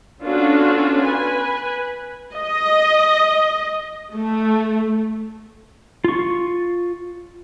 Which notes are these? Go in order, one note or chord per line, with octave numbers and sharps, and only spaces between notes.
B3 C#4 D4 F4 F#4 A4
B4 G#5
D#5
A3
F4 C#6